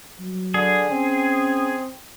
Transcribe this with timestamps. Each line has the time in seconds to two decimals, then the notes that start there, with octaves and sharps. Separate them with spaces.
0.20 F#3
0.54 D3 G#4
0.90 C4 C#4